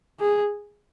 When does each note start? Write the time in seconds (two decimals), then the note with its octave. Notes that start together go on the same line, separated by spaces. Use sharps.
0.20 G#4